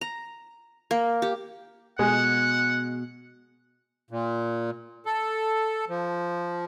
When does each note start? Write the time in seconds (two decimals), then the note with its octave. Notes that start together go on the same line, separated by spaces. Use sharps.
0.01 A#5
0.91 A#3
1.22 G4
1.99 B2 G#3 F#5
4.11 A#2
5.06 A4
5.89 F3